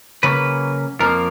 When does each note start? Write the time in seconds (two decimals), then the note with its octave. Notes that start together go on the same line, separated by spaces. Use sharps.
0.23 C#3 F#3 A#3 C#4 B4
1.00 F2 F3 A#3 A#4